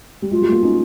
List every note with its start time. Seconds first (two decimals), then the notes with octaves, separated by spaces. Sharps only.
0.22 G3
0.31 F#3 G#3 F4
0.41 G3 A3
0.52 G#3 A#3
0.63 C#4 D#4